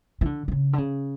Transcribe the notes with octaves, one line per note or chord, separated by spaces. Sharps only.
E3
D3
D3
C#3
D3
C#3